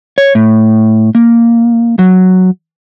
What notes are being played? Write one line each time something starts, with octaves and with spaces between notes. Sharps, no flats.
C#5
A2
A#3
F#3